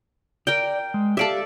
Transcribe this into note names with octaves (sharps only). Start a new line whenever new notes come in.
A#4 D5 G5
G#3
G4 A4 D5 E5 F5